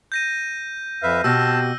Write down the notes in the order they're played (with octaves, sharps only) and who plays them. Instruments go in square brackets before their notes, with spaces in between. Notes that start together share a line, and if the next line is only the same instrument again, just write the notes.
[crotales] G6 A#6 D#7
[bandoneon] F2 B4 E5 [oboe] F5
[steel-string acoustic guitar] B2 G4 [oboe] C4 [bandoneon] A5 [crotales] E6 F6 A#6